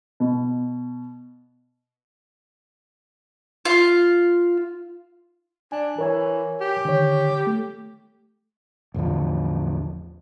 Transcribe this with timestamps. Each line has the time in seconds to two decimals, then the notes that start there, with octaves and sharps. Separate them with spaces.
0.20 B2
3.65 F4
5.72 D4 G#5
5.99 E3 A#4 C#5 G#5
6.61 G4
6.85 D3 D#3 C#5
7.47 A3
8.94 A1 E2 D3 F3